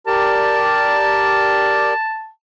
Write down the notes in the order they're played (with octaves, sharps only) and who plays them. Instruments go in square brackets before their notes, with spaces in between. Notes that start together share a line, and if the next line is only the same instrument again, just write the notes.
[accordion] G4 A#4 D5 [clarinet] A5